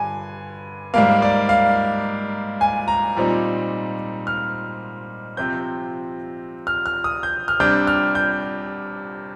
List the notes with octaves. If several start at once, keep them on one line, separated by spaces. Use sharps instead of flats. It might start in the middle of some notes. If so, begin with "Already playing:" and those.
Already playing: G2 D3 G3 G#5
G#2 G3 A#3 F5
D5
F5
G#5
A#5
A#2 G3 C4 D#4
F6
C3 F3 C4 G6
F6
F6
D#6
G6
F6
C3 G3 D4 G6
F6
G6